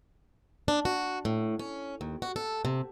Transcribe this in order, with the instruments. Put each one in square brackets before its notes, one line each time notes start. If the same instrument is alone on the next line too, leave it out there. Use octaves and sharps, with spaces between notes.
[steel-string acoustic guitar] D4
F#4
A2
C#4
D#2
F#4
A4
C3